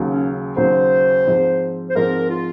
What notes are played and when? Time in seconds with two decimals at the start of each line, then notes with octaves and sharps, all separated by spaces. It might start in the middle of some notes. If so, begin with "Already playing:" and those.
Already playing: D#2 C#3 F#3
0.11 C#4
0.57 D#2 C#3 F#3 C5
1.27 G#2 F3 C4
1.89 C5
1.95 G#2 F3 C4 A#4
2.30 F4